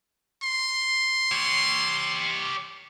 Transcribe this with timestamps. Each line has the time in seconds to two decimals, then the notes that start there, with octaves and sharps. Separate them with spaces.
0.43 C6
1.32 G4 C#5